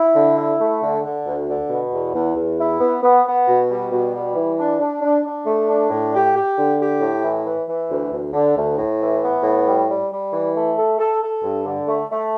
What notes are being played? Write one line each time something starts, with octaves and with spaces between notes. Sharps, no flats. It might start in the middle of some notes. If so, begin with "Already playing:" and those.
Already playing: E4
D3
E4
A3
D3
D3
D2
D3
B2
E2
E2
E2
E4
B3
B3
B3
B2
G3
B2
G3
E3
D4
D4
D4
D4
A3
D4
A2
G4
G4
D3
G4
A2
E3
E3
E3
D2
D2
D3
D2
A2
E3
B3
A2
G3
G3
G3
E3
A3
A4
A4
A4
G2
D3
A3
A3